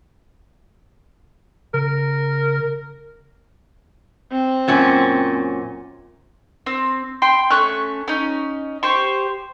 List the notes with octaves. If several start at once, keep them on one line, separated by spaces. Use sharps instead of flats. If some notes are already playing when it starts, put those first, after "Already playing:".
C#3 A#4
C4
F#2 A#2 C#4
C4
G5 C6
A3 C#4 C#6 F#6
C#4 D#4
G4 C5 C#6